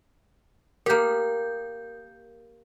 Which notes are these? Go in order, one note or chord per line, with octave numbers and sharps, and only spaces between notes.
A#3 G4 A#4 G6